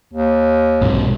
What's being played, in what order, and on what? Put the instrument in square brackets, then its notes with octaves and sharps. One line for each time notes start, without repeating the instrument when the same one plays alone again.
[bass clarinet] D#2
[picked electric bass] B1 G#2 C3